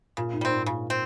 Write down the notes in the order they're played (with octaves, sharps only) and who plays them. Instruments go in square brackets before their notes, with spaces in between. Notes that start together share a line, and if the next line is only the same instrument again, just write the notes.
[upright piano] A#2 [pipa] C#3
[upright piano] G#2
[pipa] G3 C4
[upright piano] G#2
[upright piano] A#2 [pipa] C#3
[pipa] C4